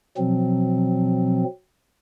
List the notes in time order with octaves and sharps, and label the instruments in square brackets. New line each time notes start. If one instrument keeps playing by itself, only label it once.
[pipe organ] B2 F3 F#3 C4